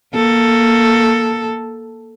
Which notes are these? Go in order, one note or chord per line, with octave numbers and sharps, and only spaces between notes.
A#3 A4